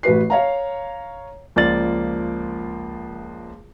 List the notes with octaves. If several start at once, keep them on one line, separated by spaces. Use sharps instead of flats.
A1 F#4 B4 C7
C#5 F5 A#5
C#2 F3 A#3 D5 A6 F#7